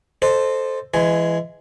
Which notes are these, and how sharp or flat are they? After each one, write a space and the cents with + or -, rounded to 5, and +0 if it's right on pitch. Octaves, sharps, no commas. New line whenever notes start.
A4 +0 C5 +0 D#5 -35
E3 +25 G#3 +0 G#5 +0